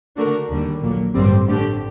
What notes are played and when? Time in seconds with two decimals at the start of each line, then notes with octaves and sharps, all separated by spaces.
0.17 D3 A3 D4 F#4 A#4
0.50 D#2 D3 G3
0.82 A#1 A#2 F#3 A#3
1.14 A1 G2 D3 G3 C4
1.47 D3 A3 D4 G4